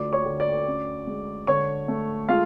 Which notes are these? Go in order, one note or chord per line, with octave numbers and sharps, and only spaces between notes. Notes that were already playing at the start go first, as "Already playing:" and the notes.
Already playing: D2 F4 D5 D6
C#5 C#6
D2
D5 D6
C#4
G#3
D3 C#5 C#6
A3
G#3 F4 F5